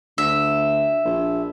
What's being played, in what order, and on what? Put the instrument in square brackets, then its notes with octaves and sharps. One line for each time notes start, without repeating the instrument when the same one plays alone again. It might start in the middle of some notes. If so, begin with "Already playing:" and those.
[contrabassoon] D2 [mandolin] E5
[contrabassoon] A#1